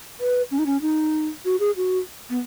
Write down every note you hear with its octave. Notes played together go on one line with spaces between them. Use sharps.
B4
C#4
D#4
C#4
D#4
F#4
G#4
F#4
B3